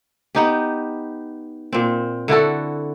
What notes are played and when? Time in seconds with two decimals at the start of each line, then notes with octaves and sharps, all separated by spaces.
0.35 B3 D#4 G4
1.73 A#2 C4
2.28 D3 E4 F#4 A4